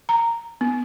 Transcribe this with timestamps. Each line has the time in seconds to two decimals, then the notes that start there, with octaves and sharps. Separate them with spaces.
0.09 A#5
0.61 B3